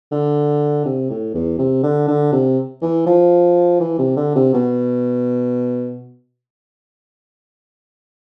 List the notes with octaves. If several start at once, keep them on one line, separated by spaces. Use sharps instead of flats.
D3
C3
A2
E2
C3
D3
D3
C3
E3
F3
E3
C3
D3
C3
B2